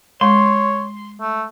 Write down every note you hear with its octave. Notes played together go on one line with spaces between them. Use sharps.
G#3 C#5 C6
A3